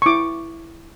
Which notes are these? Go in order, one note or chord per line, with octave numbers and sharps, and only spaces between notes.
C#6
E4 D6